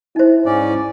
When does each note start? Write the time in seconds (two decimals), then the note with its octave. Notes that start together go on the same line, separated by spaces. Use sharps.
0.16 D#4 E4 C5
0.46 G#2 C#4 D5